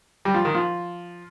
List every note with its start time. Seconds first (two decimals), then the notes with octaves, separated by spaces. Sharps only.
0.25 G3
0.34 F3
0.45 D#3
0.55 F3